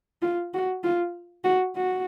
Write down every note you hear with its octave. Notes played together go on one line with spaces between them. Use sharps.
F4
F#4
F4
F#4
F#4